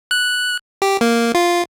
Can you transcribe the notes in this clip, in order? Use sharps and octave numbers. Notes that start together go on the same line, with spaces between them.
F#6
G4
A#3
F4